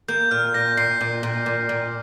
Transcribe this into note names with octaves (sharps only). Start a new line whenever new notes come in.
A#3 G6
A#2 F6
A#2 A#6
A#2 C7
A#2
A#2
A#2
A#2